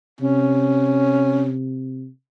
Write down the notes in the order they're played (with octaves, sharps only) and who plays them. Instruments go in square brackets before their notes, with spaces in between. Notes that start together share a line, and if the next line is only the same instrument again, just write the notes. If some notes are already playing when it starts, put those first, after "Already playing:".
[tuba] C3 [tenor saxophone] C#4